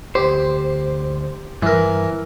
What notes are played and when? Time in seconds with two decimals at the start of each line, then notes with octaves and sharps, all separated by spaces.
0.15 D2 G4 C5
1.62 G2 E3 A#4